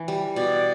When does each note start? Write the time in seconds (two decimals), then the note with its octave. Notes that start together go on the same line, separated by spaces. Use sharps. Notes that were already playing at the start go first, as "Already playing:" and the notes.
Already playing: E3
0.08 G3
0.36 B2 D5